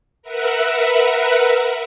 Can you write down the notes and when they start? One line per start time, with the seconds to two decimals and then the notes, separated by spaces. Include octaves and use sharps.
0.22 A#4 B4 E5 F#5